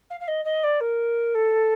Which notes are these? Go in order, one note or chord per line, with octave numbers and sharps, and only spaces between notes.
F5
F5
D#5
D#5
D5
A#4
A4